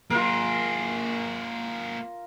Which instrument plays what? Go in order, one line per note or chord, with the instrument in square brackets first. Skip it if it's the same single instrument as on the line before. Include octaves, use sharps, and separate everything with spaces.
[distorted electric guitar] A#3 G#4 [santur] F4 A#4